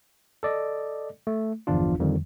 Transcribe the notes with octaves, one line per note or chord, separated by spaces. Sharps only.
A4 D5 D#5
A3
G1 E2 F3 D4 F4
F2 D3 D#3 F3 G3